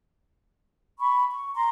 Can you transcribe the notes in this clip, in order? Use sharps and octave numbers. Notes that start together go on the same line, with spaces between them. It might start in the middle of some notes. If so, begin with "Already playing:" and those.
B5 C#6
C#6
A#5 C6